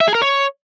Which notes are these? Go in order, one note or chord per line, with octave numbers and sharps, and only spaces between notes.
E5
G#4
A#4
C#5